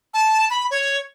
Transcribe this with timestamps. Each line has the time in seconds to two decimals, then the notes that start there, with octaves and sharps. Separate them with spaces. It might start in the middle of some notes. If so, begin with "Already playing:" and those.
0.14 A5
0.50 B5
0.71 C#5